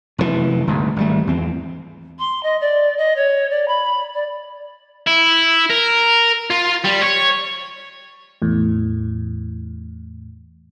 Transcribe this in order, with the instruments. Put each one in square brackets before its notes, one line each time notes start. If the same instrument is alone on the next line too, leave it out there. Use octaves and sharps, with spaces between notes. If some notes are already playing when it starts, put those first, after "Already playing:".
[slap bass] F1 F#2 A2 E3
G1 D2 G#2
G#1 G3 A3
E2 C4
[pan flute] C6
D#5
D5
D#5
C#5
D5
B5
D5
[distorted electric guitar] E4
A#4
F4
G3
C#5
[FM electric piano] E2 A2